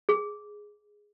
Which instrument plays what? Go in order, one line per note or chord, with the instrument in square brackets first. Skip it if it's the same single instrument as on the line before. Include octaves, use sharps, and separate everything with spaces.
[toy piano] G#4